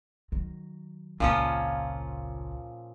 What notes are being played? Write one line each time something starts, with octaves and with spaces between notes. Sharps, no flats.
D#3 F#3
G#1 C#2 A#2 F3 C#4